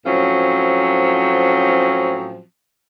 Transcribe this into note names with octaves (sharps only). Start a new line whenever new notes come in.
A2 F3 F#3 C4 C#4